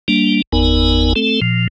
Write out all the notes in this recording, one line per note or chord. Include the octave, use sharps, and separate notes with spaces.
G3 A#3 D4
G1 E2 B3 D#4 A#4 G#5
A3 C4 A4
A#2 F3